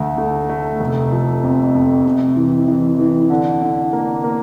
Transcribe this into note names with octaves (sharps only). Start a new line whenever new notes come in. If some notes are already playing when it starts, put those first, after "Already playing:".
Already playing: D2 A3
A3
A3
F1
F3
F2
F2
C3
E3
E3
E3
D3
D3
A#3
A#3